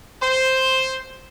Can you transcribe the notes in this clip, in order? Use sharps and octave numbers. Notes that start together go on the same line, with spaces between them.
C5